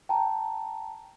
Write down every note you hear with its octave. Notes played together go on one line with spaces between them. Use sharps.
G5 A5 A#5